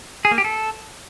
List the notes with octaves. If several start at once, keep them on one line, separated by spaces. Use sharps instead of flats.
G#4
A#3
G4
A4